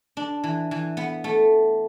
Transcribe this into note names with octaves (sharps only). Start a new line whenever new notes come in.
D4
E3
E3
B3
A3